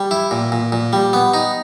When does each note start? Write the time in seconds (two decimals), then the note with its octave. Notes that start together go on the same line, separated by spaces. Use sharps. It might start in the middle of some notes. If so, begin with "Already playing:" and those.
Already playing: G3
0.11 E4
0.31 A#2
0.52 A#2
0.72 A#2
0.93 G3
1.13 B3
1.34 D#4